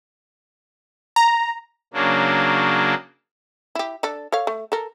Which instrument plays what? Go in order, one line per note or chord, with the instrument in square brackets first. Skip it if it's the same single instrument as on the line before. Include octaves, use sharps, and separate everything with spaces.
[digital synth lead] A#5
[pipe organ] C#3 F#3 A#3 D4
[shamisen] E4 G4
D4 A4
A4 C#5 F5
A3
A4 A#4